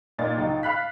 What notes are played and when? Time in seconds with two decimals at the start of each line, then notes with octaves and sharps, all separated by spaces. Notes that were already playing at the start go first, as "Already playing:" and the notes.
0.19 A#2 D#4 A6
0.36 C#2 F#3 D#4
0.63 F5 B5 F#6 B6